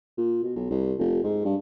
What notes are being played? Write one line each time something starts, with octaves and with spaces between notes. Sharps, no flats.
A#2
B2
B1
C2
F1
G#2
G2